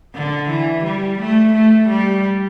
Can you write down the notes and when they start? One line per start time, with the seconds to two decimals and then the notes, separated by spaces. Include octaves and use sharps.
0.15 D3
0.50 E3
0.85 G3
1.19 A3
1.54 A3
1.88 G3